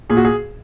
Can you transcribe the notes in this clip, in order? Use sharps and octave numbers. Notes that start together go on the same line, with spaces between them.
A#2 G#4
F#4
G#4